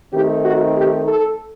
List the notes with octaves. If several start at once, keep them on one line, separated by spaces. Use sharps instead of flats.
D#3 A3 C4 D#4 G4
F#4
G4
A4